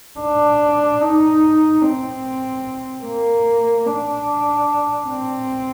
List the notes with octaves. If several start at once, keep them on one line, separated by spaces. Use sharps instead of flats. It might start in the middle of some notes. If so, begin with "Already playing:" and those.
D4
D#4
C4
A#3
D4
C4